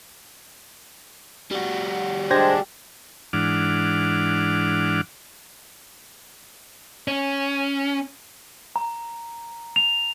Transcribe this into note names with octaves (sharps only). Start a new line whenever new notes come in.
G3 F#4
G#3 D4 G4 C5 G#6 A#6
G#2 E3 D4 F#5 D6 F6
C#4
A#5
F7